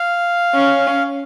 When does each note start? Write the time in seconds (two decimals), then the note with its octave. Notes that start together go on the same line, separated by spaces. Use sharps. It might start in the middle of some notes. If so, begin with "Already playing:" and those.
Already playing: F5
0.55 C#4